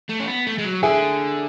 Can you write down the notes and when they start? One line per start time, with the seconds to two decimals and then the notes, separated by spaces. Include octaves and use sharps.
0.09 A3
0.20 C#4
0.27 B3
0.47 A3
0.58 G#3
0.64 F#3
0.83 D3 E4 G#4